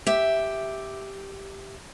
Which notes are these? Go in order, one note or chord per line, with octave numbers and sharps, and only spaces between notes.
G4 E5